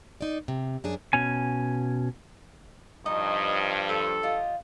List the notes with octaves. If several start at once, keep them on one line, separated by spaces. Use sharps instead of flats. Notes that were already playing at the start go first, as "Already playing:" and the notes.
D#4 D5
C3
F#2 D4 G#4
B2 C#4 G#5
G2 F3 D#4 D#5
A4 C5
F4 G4 D#5